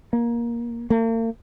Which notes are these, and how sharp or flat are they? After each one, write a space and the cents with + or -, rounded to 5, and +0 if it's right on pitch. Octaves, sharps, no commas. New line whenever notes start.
A#3 +15
A#3 -45